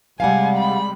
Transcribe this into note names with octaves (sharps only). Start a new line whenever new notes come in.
C3 G3 G#3 F5 F#5 G#5
B5